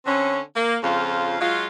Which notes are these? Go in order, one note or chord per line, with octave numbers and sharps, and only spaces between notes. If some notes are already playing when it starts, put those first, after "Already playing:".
D3 C4 C#4
A#3
F2 C#3 F4 C5 F5
F#3 G#3 F4